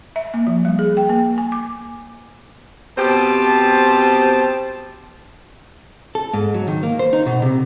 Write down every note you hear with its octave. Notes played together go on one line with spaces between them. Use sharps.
E5
A#3
F3
G3
G#4
G5
A#3
G#5
D6
B2 C4 G4 C5 A5
A4
G#2
F#3
D#3
A#3
C5
D#4
B2
C3